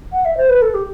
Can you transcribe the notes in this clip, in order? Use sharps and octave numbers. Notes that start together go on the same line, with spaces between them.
F#5
E5
C5
B4
A4
G4